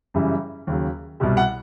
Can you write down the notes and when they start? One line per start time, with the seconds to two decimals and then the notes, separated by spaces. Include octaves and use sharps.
0.14 F#2 C#3 E3 G3
0.67 D#2 C#3 F#3
1.20 C2 B2 G3
1.37 F#5